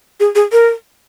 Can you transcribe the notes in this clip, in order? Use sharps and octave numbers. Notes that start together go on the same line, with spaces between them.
G#4
G#4
A#4